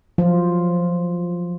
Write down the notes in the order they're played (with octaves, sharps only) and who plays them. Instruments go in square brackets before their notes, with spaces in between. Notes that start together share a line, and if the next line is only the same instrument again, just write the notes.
[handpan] F3 F#3 F4 C5